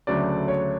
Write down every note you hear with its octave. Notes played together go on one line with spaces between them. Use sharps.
D2 C#3 F#3 A3 D4 D5
C#5